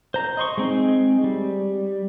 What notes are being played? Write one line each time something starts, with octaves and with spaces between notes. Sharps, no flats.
C5 A#5
D#5 C6 C#6
G#3 C4 D#4
G3